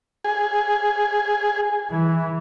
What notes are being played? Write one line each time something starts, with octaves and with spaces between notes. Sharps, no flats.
G#4
E3